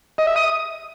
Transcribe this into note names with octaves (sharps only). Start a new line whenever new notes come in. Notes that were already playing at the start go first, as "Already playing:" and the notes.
D#5
E5
D#6